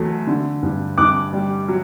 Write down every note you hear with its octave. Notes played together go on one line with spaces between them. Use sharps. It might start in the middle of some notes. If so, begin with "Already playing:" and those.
Already playing: E2 F#3 A3
D3
G2
G2 D6 F#6
G3
F#3